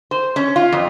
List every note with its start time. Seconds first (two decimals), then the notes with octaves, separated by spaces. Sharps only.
0.11 C5
0.36 C#4
0.56 F4
0.72 F2